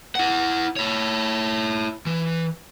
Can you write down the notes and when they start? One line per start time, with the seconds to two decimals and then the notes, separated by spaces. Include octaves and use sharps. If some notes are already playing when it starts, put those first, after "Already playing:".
0.15 E4 F#5
0.76 E4 C#5
2.06 E3